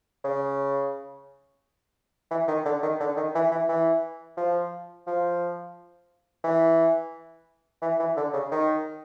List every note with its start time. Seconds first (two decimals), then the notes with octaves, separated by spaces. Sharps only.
0.24 C#3
2.31 E3
2.48 D#3
2.65 D3
2.83 D#3
3.00 D3
3.17 D#3
3.35 E3
3.52 E3
3.69 E3
4.37 F3
5.07 F3
6.44 E3
7.82 E3
7.99 E3
8.17 D3
8.34 C#3
8.51 D#3